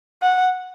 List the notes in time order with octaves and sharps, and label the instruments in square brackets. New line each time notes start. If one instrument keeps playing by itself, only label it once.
[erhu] F#5